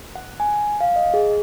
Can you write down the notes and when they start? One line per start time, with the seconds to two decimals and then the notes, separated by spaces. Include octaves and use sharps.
0.15 F#5
0.40 G#5
0.81 F5
0.96 D#5
1.14 G#4